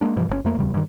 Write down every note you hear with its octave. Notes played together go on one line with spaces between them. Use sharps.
G#3 A#3 D4
G2 B2 E3 F3
G1 C3 C#4
F2 F3 A3 A#3
D1 E2 C#3 G3
G2 D#3